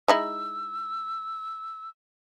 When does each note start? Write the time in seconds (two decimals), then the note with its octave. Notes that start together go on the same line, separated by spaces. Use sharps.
0.08 G#3 D#4 E4 E6